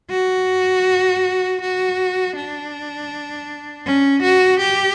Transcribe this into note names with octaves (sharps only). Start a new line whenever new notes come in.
F#4
F#4
D4
C#4
F#4
G4